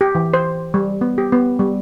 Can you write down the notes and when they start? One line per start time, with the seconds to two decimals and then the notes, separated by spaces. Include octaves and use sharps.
0.01 G4
0.15 E3
0.34 C5
0.74 G3
1.01 B3
1.18 G4
1.32 B3
1.59 G3